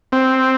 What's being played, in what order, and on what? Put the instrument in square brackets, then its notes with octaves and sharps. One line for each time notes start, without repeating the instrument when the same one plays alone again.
[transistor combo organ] C4